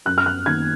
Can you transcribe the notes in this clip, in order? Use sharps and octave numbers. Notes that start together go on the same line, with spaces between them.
F#2 F#6
F6
F#6
D#3 A#3 G#6